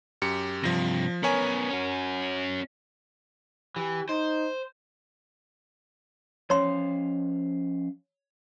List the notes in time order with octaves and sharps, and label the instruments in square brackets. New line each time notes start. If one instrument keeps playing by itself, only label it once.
[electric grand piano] F#2 G4 C#7
[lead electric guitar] G2 C3 [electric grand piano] F3 A#6
[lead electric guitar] B3 C#4 [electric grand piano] A#4 C#5 G#5
[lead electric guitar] C#4 F#4
[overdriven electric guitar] E3 [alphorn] G4
[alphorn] D#4 [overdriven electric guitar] C5
[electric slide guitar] F3 C#4 F5 [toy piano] C#5 C6